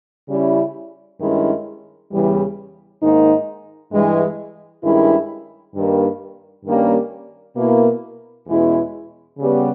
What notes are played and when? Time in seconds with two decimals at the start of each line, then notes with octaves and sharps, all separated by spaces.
0.28 C#3 G3 C#4 E4
1.20 G2 D#3 G#3 C#4 E4
2.11 E2 C#3 E3 G3
3.02 G#2 D#3 A#3 D#4
3.92 G2 E3 G#3
4.83 G2 D#3 G#3 C#4 E4
5.74 G2 D#3 A#3
6.65 G2 D#3 G3 A#3 C#4
7.55 B2 A#3 E4
8.46 E2 B2 G#3 C#4 E4
9.38 C#3 G3 B3